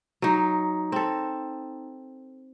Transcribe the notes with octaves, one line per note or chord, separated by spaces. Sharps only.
F#3 D#4
C4 A4